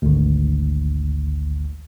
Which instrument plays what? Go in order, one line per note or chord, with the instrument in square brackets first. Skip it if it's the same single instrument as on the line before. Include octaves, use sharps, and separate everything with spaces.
[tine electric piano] G#1 D2